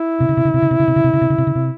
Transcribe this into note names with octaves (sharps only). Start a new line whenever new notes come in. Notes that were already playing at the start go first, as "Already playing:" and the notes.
Already playing: E4
C3
C#3
C3
C#3
C3
C#3
C3
C#3
C3
C#3
C3
C#3
C3
C#3
C3
C#3
C3